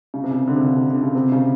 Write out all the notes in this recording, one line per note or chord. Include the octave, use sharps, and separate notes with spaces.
C#3
C3
C#3
D3
C3
C#3
C#3
D3
C#3
C3
C#3